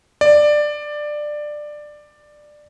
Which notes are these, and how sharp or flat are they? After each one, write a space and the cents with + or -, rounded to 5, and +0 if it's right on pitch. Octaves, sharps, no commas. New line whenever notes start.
D5 +15